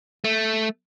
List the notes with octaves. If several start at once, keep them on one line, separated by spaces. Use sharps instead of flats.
A3